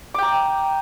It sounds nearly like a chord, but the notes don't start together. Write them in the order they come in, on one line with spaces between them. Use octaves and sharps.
D6 G5 A#5